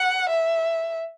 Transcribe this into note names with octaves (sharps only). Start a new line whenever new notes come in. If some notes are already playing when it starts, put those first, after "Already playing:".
Already playing: F#5
E5